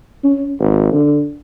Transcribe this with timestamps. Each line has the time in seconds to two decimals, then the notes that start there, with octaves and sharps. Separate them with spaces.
0.24 C#4
0.60 G#1
0.93 D3